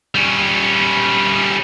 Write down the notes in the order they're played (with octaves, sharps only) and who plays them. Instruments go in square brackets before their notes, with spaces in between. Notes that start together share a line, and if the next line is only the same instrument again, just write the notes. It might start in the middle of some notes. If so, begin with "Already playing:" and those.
[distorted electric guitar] G3 C#4